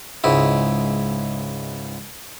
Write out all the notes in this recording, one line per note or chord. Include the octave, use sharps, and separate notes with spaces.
C#2 G#2 E4